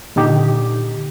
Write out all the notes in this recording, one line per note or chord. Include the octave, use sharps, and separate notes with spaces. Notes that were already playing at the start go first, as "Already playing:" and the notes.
A#2 D3 D#4 G4